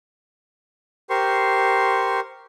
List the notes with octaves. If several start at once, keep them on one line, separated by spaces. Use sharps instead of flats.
G4 A#4 C5 C6 C#6